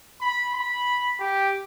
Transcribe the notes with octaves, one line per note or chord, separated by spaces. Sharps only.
B5
B5
G4